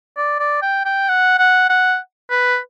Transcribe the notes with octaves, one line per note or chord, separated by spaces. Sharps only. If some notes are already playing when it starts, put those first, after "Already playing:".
D5
D5
G5
G5
F#5
F#5
F#5
B4